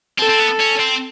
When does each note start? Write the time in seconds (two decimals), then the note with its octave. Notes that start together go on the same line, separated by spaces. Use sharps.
0.19 C4 A4
0.30 C4
0.40 B3
0.60 C#4
0.80 C4